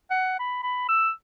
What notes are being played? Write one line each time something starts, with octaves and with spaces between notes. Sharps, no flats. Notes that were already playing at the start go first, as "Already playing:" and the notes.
F#5
B5
B5
E6